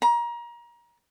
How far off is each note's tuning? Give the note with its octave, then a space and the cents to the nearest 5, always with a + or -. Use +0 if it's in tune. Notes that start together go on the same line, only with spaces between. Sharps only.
A#5 +30